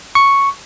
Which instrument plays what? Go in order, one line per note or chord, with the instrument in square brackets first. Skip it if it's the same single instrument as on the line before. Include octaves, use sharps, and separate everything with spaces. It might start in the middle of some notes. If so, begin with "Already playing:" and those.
[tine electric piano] C#6